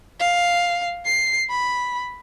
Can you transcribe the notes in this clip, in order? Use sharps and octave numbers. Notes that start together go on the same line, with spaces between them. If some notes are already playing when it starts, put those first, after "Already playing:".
F5
C7
B5